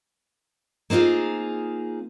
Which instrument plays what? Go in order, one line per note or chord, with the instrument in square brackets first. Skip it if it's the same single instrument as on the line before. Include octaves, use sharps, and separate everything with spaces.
[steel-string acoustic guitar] A#3 C4 D#4 F4 G#4